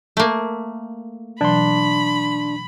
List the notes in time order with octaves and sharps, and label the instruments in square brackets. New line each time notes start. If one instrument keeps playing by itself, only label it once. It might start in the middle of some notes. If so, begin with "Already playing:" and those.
[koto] A3 A#3
[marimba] B2 E3 F#3 [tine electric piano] D4 C6 [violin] B5